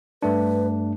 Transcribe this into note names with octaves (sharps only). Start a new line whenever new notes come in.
G2 A3 D4 B4